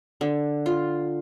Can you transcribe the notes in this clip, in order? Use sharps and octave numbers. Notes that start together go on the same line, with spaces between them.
D3
F4